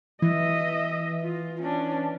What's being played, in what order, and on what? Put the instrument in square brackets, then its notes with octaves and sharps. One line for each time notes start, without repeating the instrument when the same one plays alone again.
[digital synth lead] E3 [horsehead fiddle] D#5 E5
[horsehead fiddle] F4
C#4 D4